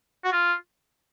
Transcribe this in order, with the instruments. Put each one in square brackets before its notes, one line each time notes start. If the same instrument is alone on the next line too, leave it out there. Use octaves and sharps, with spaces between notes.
[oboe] F#4
F4